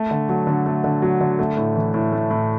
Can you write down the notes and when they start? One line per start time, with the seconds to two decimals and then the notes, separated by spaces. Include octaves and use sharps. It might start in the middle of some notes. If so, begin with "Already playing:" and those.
Already playing: A3
0.11 D3
0.29 F#3
0.47 D3
0.66 A3
0.84 D3
1.02 F#3
1.21 D3
1.39 A3
1.57 A2
1.76 E3
1.94 A2
2.12 A3
2.31 A2